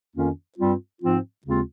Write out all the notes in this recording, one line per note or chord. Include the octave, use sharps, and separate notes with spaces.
F2 D#3 A#3 C#4 F4
G2 G3 C4 F4
G#2 F3 C4 F4
D#2 C#3 G#3 C4 F4